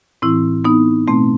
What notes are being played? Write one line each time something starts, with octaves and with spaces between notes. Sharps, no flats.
A2 E3 C4 E4
B3 D#4
B2 A3 C4